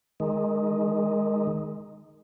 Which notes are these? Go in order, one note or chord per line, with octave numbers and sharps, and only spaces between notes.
D#3 G#3